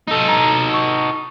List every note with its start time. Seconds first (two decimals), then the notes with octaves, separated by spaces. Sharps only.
0.08 D#4 A4
0.28 A#5
0.74 C#6